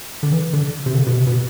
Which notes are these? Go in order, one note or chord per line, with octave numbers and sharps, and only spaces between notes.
D3
E3
D3
C3
D3
B2
C3
B2